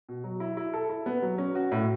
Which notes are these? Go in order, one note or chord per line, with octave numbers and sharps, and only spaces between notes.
B2
F#3
E4
E4
A4
E4
B3
F#3
C#4
F#4
A2